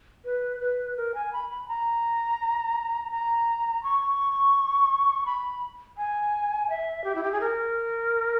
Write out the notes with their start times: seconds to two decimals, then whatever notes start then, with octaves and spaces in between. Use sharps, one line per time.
0.25 B4
0.61 B4
0.97 A#4
1.15 G#5
1.33 B5
1.50 B5
1.68 A#5
3.11 A#5
3.83 C#6
5.26 B5
5.97 G#5
6.70 E5
7.04 G4
7.15 E4
7.23 G4
7.32 G#4
7.41 A#4